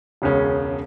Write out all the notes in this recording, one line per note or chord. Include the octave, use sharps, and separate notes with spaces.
E1 C#2 C#3 C#4